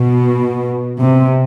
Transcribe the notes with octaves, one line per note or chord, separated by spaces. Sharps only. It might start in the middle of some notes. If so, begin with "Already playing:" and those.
Already playing: B2
C3